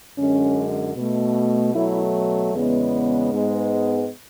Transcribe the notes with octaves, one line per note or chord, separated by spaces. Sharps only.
F#2 D3 G#3 C#4
B2 A3
B2 F#3 A3 E4
E2 C#3 G#3 B3
G#2 G#3 B3